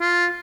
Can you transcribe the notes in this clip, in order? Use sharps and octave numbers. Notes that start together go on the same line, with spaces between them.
F4